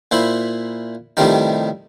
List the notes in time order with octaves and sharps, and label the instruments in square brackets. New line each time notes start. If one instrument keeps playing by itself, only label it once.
[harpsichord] A#2 E4 C5 B5
A2 C3 D#3 F3 G3 D#4